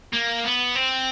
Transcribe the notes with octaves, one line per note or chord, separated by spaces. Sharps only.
A#3
B3
C4